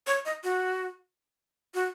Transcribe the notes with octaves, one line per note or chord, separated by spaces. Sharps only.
C#5
D#5
F#4
F#4